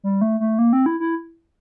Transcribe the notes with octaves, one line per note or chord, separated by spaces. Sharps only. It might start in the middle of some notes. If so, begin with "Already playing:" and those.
G3
A3
A3
A#3
C4
E4
E4